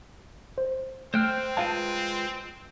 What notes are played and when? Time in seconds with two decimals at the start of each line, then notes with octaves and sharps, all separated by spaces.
0.58 C5
1.14 A3 C4 C5 G5 F6 F#6
1.57 G#3 F4 B4 F5 A5